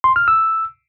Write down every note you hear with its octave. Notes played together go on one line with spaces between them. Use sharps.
C6
F6
E6